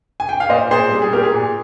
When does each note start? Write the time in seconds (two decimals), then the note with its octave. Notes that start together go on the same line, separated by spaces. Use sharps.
0.20 G#5
0.29 G5
0.40 F5
0.49 A#2 C5 D#5
0.71 A#2 G#4 C5
0.91 G3 G#4
1.02 G#4
1.12 A#2 G4 A#4
1.23 G#4
1.34 A#2